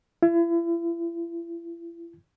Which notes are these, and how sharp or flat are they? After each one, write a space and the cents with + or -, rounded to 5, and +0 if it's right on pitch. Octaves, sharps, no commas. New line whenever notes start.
E4 +40